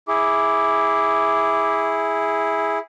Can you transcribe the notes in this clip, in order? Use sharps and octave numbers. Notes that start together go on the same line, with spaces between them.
E4 G#4 D6